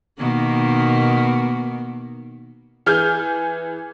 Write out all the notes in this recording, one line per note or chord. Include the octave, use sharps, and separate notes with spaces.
B2 D#3 A#3
E3 G#4 F6 G6